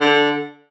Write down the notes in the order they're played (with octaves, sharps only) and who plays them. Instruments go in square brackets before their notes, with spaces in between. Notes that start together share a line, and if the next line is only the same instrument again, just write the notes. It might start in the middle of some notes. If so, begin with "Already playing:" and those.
[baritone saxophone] D3